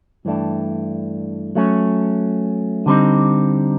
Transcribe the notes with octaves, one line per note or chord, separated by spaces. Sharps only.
G2 E3 A3 D4
F#3 A3 C#4
D3 G3 C4 D#4